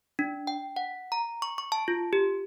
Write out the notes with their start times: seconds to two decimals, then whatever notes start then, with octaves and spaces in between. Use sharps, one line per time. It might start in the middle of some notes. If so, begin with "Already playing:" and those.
0.19 D4
0.47 G5
0.76 F#5
1.12 A#5
1.42 C#6
1.58 C#6
1.72 A5
1.88 F4
2.13 G4